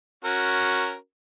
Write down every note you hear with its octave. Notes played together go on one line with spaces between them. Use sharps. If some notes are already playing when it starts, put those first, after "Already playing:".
C#4 F#4 A#4